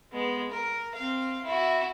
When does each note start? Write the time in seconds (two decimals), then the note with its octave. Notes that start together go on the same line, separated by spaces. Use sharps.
0.12 G#3 B3
0.50 A#4
0.95 C4 F5
1.44 E4 F#4